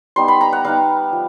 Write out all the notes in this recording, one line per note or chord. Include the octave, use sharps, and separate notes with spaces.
G3 B3 D#4 C6
B5
A#5
F#5
G3 B3 D#4 F5
F3